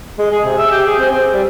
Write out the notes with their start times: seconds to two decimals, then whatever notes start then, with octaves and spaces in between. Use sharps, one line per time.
0.18 G#3
0.31 G#4
0.45 C3
0.57 E5
0.71 G4
0.86 G#4
0.99 C4
1.11 C4
1.33 G3